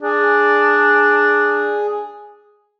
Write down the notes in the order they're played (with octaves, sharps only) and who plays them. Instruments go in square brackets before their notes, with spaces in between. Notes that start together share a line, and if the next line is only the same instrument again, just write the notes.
[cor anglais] D4 [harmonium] G#4